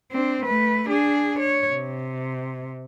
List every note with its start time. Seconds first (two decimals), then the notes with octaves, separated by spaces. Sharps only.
0.12 C4 D4
0.44 A3 B4
0.89 D4 G#4
1.39 C#5
1.73 C3